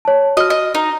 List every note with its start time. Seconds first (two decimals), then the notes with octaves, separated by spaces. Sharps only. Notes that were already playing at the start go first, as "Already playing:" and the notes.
0.05 C#5 A5
0.37 F#4 D#5 F6
0.50 D#5
0.75 D#4